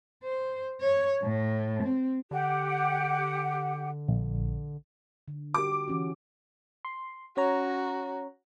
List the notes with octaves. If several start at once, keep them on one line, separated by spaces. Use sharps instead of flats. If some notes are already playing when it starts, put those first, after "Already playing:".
C5
C#5
A2
C4
D3 G4 F#5
A#1
D3
F#4 G4 D6
G4
E3 C#4 F#4
C6
C#4 F#4 C#5 A#5